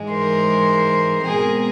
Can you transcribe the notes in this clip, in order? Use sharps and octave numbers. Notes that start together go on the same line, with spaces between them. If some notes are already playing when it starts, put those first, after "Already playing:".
Already playing: G#2 E3 G#3
A#4 C5
B2 G#3 C4 G#4 A#4